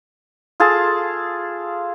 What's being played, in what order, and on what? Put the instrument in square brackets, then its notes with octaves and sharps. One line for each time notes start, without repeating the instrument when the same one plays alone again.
[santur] F4 G#4 A4 A5